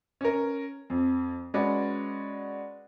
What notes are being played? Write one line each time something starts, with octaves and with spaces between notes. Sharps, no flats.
C#4 A#4
F2
G#3 C#4 F#4 B4 D5